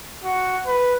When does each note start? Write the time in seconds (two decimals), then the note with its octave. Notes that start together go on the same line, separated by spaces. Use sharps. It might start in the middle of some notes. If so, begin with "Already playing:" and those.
0.24 F#4
0.67 B4